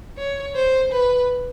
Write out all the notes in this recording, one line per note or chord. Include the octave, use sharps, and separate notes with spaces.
C#5
C5
B4